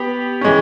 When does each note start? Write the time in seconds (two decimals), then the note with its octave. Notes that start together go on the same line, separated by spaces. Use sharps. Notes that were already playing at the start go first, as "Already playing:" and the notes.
Already playing: B3 G4
0.41 E3 G#3 C#4